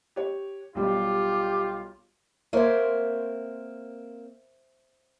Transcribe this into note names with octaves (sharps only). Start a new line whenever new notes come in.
G4 C#5
B1 G3 F4 G4
A#3 C4 C5 C#5 E5